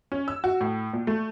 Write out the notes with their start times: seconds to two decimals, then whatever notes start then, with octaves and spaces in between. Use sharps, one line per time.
0.12 C#4
0.28 E6
0.44 F#4
0.61 A2
0.93 A#2
1.07 A3